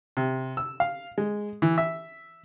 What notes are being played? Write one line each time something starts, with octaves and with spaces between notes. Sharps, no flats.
C3
E6
F5
G#3
E3
E5